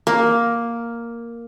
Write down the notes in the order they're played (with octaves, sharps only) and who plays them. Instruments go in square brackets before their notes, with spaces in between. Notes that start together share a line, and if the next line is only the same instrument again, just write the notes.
[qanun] A#3